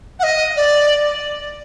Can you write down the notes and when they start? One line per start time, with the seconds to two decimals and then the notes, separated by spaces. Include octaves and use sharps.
0.19 F#5
0.23 D#5
0.56 D5